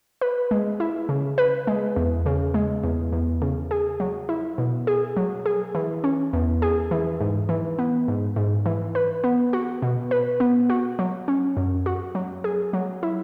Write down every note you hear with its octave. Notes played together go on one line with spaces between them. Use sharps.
B4
G#3
E4
C#3
B4
G#3
E2
C#3
G#3
E2
E2
C#3
G#4
F#3
E4
B2
G#4
F#3
G#4
E3
C#4
E2
G#4
E3
G#2
E3
B3
G#2
G#2
E3
B4
B3
F#4
B2
B4
B3
F#4
F#3
C#4
F#2
F#4
F#3
G#4
F#3
E4